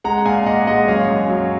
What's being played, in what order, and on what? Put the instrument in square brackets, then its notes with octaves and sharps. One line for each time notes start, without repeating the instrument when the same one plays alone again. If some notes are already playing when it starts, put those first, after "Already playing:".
[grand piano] G#3 F#5 A#5
A#2 F5 G#5
A#2 D#5 F#5
G#3 D#5 F#5
F#2 C#5 F5
F#2
F#3